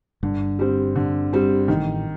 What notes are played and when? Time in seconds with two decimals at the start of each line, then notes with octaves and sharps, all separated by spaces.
0.23 G1 G2 D3
0.59 G3 C4
0.96 D3
1.33 G3 C4
1.68 A1 A2 D#3